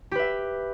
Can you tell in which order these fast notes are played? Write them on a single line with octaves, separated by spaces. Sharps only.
G4 B4 E5